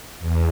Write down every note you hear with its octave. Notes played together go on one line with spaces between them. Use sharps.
E2